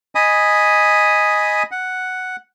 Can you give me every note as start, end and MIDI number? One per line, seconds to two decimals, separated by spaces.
0.15 1.63 75
0.15 1.63 80
0.15 1.63 83
0.15 1.63 87
1.71 2.36 78